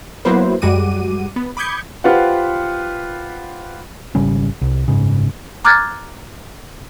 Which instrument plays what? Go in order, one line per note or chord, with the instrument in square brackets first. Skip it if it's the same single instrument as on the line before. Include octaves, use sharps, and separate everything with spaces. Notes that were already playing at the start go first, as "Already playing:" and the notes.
[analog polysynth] F#3 A#3 B3 E4 B4 C5
F#2 G3 G#3 F#4 D6 D#7
B3
B5 D6 D#6 G6 G#6 C#7
[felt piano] F4 G4 B4 C5 F#5
[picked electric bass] G#1 C#3 G3 C#4
C2
F#1 G#2 C#3
[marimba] A#5 D6 F6 F#6 G#6 A6